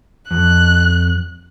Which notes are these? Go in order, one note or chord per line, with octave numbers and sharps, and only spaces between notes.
F2 F#6